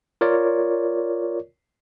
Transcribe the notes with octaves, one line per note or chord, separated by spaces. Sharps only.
F4 A#4 C#5 D5